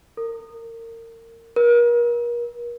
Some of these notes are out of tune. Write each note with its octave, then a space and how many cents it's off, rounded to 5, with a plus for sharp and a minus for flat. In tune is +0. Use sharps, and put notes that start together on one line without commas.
A#4 -30
A#4 +40